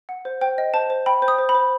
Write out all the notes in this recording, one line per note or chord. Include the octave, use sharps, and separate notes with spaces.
F#5
C5
C5 G5
D#5
C5 A5
C5
G5 B5
C5
D#6
C5
B5
C5